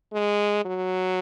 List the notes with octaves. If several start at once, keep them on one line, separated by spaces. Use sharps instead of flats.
G#3
F#3